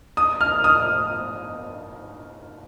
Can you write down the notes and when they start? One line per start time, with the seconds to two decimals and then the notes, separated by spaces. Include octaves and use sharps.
0.17 D#6
0.41 F6
0.64 D#6